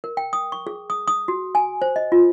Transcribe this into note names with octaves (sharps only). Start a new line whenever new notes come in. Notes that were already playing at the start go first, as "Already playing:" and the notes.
A#4
G5
D#6
C#6
G#4
D#6
D#6
F#4
G#5
C5
D#5
F4